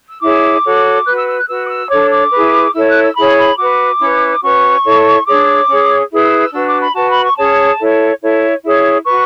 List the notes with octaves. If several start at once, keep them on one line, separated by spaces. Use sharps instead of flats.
E6
E4 G#4 C#5 D6
F#4 A4 C#5
F#4 B4 F#6
E6
E6
F#6
F#4 B4 E6
D6
E6
D4 A4 C#5 D6
D6
E4 G#4 B4
E4 A4 C#5 E6
F#6
E6
E4 G#4 C#5 B5
B5
F#4 B4 D6
C#4 E4 B4
C#4 F#4 B4 C#6
E4 A4 C#5
D4 G#4 C#5 D6
C#4 G#4 C#5
E4 G#4 B4
E6
E6
D4 F#4 B4 E6
D6
B5
F#4 B4 A5
B5
C#6
C#4 G#4 C#5 A5
E4 A4 C#5
E4 A4 C#5
E4 G#4 C#5
F#4 B4 C#6